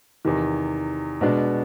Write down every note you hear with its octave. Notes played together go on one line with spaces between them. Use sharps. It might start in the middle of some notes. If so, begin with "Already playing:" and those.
E2 C3 D#3
B2 G#3 B3 D4